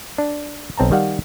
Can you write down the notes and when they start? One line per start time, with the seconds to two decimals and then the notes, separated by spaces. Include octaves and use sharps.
0.18 D4
0.77 B1 C4 A5 A#5
0.91 D#3 G3 F5 F#5